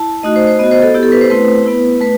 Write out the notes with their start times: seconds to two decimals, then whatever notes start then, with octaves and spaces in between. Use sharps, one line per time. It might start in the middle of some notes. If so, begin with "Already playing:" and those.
Already playing: E4 A5
0.23 A3 D#4 F#4 D#5
0.36 C5
0.47 C5
0.59 B3 F#4 D#5
0.71 C5
0.82 A4
0.94 B3 E4 G4
1.03 A4
1.12 B4
1.21 C5
1.30 A3 C4 E4 B4
1.66 B3 E4
2.01 A3 B4